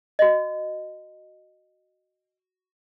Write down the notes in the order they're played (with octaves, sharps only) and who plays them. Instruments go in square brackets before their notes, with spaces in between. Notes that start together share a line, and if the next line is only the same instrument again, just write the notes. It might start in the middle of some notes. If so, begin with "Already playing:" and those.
[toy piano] F#4 D#5